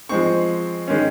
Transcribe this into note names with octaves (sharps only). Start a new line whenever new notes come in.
F3 G#3 C4 C#6
D#3 G#3 C#4